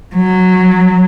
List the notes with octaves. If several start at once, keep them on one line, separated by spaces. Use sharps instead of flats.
F#3